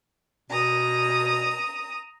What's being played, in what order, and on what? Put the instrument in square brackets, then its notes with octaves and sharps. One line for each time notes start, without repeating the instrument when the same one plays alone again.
[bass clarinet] B2 [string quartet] A#5 D#6